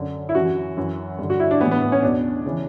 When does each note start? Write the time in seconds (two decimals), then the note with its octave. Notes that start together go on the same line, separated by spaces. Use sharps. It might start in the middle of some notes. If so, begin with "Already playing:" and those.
Already playing: F#2 D3
0.29 E4
0.35 F#2 E3 F#4
0.77 F#2 E3
1.19 G2 D3
1.30 F#4
1.40 E4
1.51 D4
1.61 A2 E3 B3
1.71 B3
1.82 B3
1.92 C#4
2.03 E2 B2 D4
2.46 C#3 E3